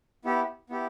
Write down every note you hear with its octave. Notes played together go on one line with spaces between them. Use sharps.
B3 E4 G4
B3 E4 G4